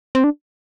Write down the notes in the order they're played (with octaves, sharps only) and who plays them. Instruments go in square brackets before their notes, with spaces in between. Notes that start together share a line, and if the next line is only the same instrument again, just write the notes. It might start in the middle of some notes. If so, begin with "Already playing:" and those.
[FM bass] C4
D4